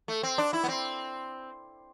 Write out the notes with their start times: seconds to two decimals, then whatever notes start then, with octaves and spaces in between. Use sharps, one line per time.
0.08 A3
0.23 C4
0.38 D4
0.53 E4
0.64 B3
0.68 C4